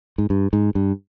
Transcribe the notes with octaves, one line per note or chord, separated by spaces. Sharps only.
G#2
G2
G#2
G2